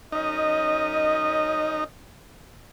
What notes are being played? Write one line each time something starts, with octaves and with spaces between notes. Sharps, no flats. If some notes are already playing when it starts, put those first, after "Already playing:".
F#2 C#4 D#4 D#5